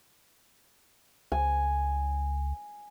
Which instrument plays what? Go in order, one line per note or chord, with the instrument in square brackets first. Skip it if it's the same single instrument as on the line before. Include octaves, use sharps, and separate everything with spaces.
[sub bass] C#2 [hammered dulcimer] G#5